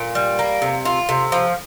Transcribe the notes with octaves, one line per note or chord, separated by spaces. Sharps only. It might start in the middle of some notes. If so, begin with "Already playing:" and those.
Already playing: A#2
G3
A#3
C3
F4
C3
F3